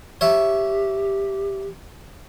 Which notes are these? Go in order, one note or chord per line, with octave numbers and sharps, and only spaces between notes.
G4 C#5 E5